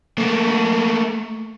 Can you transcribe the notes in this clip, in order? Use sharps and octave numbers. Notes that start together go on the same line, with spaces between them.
A3 A#3